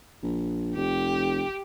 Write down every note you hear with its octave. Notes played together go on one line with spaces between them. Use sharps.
A#1
F1 G4